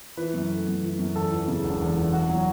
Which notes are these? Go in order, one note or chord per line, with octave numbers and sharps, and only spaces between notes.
E3 B4
F#2
A3
F#2
E3
F#2
E2 A4
E3
C#3
E1
E2
E3
E2 F#4
F#3